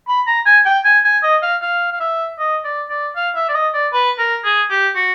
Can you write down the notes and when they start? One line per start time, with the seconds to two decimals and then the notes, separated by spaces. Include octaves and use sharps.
0.08 B5
0.27 A#5
0.46 G#5
0.65 G5
0.85 G#5
1.04 G#5
1.23 D#5
1.43 F5
1.62 F5
1.93 F5
2.00 E5
2.39 D#5
2.65 D5
2.90 D5
3.16 F5
3.35 E5
3.49 D5
3.55 D#5
3.74 D5
3.93 B4
4.18 A#4
4.45 G#4
4.70 G4
4.95 F#4